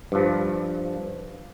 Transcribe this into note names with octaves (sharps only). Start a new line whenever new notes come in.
G2 F3